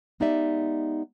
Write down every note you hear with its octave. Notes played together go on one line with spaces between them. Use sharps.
G#3 B3 D#4 G4 D5 E5